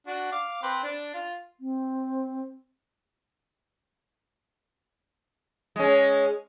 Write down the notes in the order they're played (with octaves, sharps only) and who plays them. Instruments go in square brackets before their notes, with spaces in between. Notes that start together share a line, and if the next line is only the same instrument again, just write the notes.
[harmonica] D4 F#4
F5 D6
C4 B4 C5
D4
F4
[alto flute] C4
[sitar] G#3 C#4